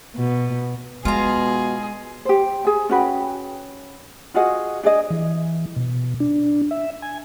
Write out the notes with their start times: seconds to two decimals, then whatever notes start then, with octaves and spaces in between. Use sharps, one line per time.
0.15 B2
1.05 B2 G#3 F4 G#4 A#5
2.25 G4 C5
2.65 G#4 G#5
2.89 C#4 F#4 B4 G5
4.34 F4 F#4 G#4 D#5
4.83 D4 G#4 D5 D#5
5.10 E3
5.76 B2
6.20 D4
6.71 E5
7.02 G#5